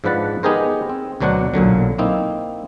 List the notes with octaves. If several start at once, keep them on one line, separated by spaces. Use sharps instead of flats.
G#2 F3 D4 B4 F#5 A5
B3 D#4 G4 G#4 A#4 C5
C4
D2 B2 F#3 D4 C5 F#5
B1 A#2 D3 F#3
A#3 C4 D#4 E4